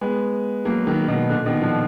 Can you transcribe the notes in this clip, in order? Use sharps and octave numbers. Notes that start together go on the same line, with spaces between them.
G#3 B3
F#3 A#3
D#3 F#3
B2 D#3
A#2 D3
B2 D#3
D3 F3